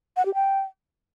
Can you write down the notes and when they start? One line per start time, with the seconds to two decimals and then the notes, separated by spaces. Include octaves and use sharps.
0.17 F#5
0.26 G4
0.34 G5